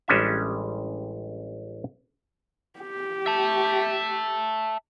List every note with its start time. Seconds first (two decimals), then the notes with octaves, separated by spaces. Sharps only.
0.08 A1 G3 G#3 C#4 D4 E5
2.79 G4
3.26 E5 A5